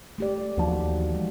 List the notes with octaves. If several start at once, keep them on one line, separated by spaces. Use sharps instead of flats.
A3 G4 D5
D#2 E3 F3 D#4 F#4
E3 G#3